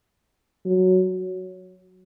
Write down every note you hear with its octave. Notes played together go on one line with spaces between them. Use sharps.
F#3